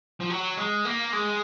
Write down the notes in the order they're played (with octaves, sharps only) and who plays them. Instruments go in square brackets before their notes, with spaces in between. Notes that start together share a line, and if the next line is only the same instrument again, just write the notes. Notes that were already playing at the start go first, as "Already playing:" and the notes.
[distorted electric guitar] F3
F#3
G#3
A#3
G#3